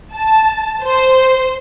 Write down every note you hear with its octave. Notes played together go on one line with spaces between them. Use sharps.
A5
C5